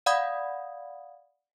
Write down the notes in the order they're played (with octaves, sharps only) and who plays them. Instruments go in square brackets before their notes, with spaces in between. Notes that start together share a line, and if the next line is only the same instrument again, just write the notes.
[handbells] D5 F5 F#5 B5 D#6 G#6